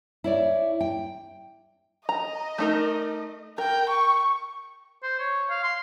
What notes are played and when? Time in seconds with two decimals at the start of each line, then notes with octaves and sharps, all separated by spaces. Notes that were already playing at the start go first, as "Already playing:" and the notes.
0.24 E4 C#5 D5
0.81 G5
2.09 D#5 A#5
2.58 A3 D#4 A#4
3.58 A#4 G5
3.90 C#6
5.03 C5
5.19 C#5
5.50 F5
5.63 C6